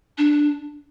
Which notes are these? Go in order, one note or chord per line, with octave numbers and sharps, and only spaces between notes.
D4